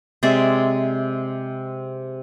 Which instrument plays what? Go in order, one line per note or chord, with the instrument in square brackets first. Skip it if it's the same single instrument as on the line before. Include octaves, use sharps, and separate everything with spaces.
[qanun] C3 G#3 D5 E5